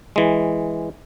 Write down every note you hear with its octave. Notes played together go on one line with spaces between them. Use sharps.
E3 G#3